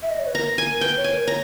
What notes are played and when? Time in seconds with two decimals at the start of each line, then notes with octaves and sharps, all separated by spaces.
0.03 E5
0.10 D#5
0.19 C#5
0.27 B4
0.35 A#4 A#5
0.58 G#5
0.81 B4 G5
0.96 C#5
1.04 G#5
1.12 A#4
1.27 C#5 A#5